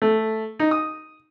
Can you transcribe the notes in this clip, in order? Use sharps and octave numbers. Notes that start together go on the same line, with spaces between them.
A3
D#4
D#6